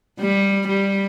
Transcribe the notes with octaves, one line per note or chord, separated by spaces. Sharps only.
G3
G3